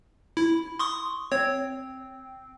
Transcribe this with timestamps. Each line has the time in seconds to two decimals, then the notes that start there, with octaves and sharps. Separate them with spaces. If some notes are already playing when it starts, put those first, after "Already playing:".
0.37 E4
0.79 C6 C#6 D#6
1.32 C4 C#5